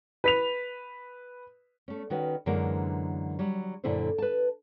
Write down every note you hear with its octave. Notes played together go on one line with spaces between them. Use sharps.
B4 B6 F7
A3 C#4
D#3 C#4 F#4 B4
F#2 D3 E3 G#3 A#3 A#4
F#3 G3
F#2 A#2 D3 E4 A4 C5
B4 A5